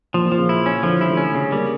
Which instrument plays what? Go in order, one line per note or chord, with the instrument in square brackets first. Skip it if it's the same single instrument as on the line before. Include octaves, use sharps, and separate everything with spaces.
[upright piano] A#2 [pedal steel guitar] F3
[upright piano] A#2
[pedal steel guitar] F3
[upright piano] C#3
[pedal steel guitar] E4
C#4
[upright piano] D3 [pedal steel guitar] F3
[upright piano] E3
[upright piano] G3 [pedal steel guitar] E4
[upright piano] A3
[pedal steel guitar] C#4
C#3
[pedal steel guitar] G3 [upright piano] A#3